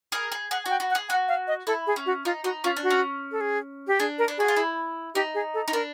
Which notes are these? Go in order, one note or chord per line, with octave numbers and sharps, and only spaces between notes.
G#4 A#4
G#4
G#4 F#5
F#4 G5
F#4
F#5
G#4
F#4 F#5
F5
D#5
E4 A4
G#4
C#4
F#4
D#4 F4
D#4 F#4
C#4 F4
D4
F#4
C#4
A4
G#4
G4
D4 G#4
A#4
D4
F#4 G#4
F4
E4
D#4 G4
G#4
A4
D#4
D4 A#4